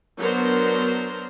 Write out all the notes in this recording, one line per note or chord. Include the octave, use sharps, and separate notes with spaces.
F#3 B3 D4 A#4 C5